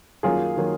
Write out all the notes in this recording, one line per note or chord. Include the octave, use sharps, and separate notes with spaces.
F#2 D#3 F#3 A#3 F4 G#4
D#3 F#3 A#3